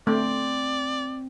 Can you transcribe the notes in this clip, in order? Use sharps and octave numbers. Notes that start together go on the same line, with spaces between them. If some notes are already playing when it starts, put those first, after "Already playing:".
A3 C4 D5